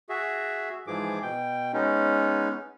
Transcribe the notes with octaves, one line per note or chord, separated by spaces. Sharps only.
F#4 G#4 E5
G#2 E3 F3 G#4 D6
B2 G5
G#3 B3 C#4 D#4